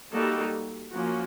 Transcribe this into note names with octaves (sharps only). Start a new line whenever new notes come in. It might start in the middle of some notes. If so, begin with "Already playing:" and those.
G3 A#3 D#4 F#4 A4
F3 A#3 C#4 F#4